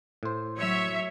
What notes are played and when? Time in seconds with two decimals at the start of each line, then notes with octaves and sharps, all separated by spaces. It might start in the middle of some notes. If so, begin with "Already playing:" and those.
0.23 A2 C5
0.56 F#3 C#5 E5